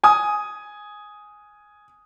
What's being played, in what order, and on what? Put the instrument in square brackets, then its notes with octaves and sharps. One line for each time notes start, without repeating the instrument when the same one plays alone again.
[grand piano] G#5 D#6